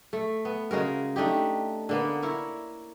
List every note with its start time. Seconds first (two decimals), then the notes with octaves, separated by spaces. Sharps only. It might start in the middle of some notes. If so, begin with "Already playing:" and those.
0.13 A3
0.45 B3
0.71 C#3 G#3 F#4 A#4
1.16 A3 D4 D#4 G4
1.89 D3 A#3 B3
2.23 E4 A#4 C#5